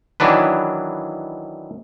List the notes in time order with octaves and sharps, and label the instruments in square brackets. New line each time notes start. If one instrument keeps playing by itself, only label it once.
[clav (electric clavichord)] D#3 E3 F#3 D4 B4